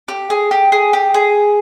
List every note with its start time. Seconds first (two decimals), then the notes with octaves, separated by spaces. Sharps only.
0.08 G4
0.30 G#4
0.51 G4
0.72 G#4
0.93 G4
1.14 G#4